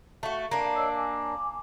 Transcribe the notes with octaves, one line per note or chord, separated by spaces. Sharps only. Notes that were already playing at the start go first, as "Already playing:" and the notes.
A3 F#4 F5
A#3 D4
C#5 D#5 E6
G#5 D6